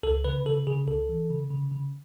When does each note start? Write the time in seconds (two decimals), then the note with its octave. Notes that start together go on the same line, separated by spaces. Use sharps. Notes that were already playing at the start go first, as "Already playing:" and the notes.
0.03 C#2 A4
0.24 C#3 B4
0.45 C#3 A4
0.67 C#3 G#4
0.87 C#2 A4
1.09 E3
1.30 C#3
1.50 C#3
1.71 C#3